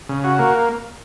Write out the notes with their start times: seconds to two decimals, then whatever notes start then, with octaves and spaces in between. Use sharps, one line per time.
0.09 C#3
0.24 F#4
0.39 A#3